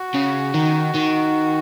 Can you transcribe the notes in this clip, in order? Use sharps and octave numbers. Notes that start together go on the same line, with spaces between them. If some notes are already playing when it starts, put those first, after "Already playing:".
Already playing: F#4
C#3
D#3
D#3